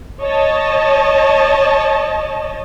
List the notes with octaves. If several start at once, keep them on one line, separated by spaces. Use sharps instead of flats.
C#5 D#5 A5